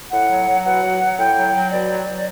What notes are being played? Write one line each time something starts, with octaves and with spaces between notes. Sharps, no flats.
A2 F#5
F#3
F#3
B2 F#5
F#3
F#3
A2 G5
F#3
F#3
B2 D5
F#3
F#3